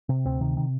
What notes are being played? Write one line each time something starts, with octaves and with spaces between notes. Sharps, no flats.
C3
D2 C4
C3 D#3
D#3